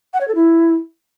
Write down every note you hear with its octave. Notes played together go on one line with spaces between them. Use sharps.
F#5
C#5
A4
E4